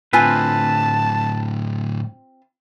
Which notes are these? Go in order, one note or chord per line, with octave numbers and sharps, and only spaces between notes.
A2 D3 C4 F4 B4 G#5 A5